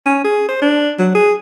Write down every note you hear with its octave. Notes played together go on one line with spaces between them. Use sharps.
C#4
G#4
C5
D4
F#3
G#4